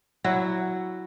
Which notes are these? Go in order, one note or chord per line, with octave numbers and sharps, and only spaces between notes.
F#3 E4 F#4